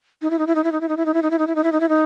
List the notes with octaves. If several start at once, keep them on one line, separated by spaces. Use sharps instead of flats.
D#4
E4
D#4
E4
D#4
E4
D#4
E4
D#4
E4
D#4
E4
D#4
E4
D#4
E4
D#4
E4
D#4
E4
D#4